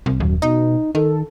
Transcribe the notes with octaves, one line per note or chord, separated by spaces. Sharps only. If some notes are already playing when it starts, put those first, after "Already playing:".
C2
D#1 F#2
B2 D#4
D#3 A4